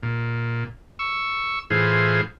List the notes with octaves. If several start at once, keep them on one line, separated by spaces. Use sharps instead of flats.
A#2
C#6 E6
A2 E3 F4 G#4 C5